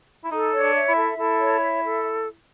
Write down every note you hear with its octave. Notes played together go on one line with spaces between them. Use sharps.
E4
D#4 A4
C#5
D4
E5
E4
A4
E4 A4
C#5
E5
A4